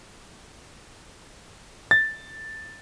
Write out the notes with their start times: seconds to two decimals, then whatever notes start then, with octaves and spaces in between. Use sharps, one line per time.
1.91 A6